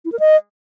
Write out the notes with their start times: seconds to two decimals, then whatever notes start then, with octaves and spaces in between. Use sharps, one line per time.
0.05 E4
0.12 A#4
0.19 D#5